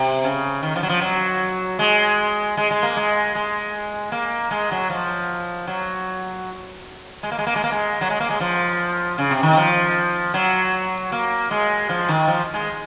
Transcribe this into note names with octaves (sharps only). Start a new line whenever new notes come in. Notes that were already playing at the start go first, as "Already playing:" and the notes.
Already playing: C3
C#3
D#3
F3
F#3
F3
F#3
G#3
G#3
G#3
A#3
G#3
G#3
A#3
G#3
F#3
F3
F#3
G#3
A#3
G#3
A#3
G#3
A#3
G#3
F#3
G#3
A#3
G#3
F3
C#3
C3
D#3
F3
F#3
A#3
G#3
F3
D#3
F3
G#3